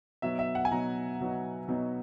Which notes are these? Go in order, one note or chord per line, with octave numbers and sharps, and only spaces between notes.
B2 F#3 B3 D#4 E5
E5
F#5
G#5
B2 F#3 B3 D#4 A#5
B2 F#3 B3 D#4
B2 F#3 B3 D#4